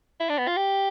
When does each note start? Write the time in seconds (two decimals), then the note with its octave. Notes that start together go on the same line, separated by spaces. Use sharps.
0.20 E4
0.29 D4
0.38 B3
0.48 F4
0.57 G4